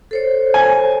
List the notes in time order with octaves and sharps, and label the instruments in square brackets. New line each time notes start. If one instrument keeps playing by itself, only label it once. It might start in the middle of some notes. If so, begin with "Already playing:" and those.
[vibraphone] A4 C5 C#5
[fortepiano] G#5